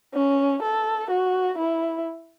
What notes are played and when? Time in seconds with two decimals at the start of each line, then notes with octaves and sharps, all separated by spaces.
0.14 C#4
0.62 A4
1.10 F#4
1.58 E4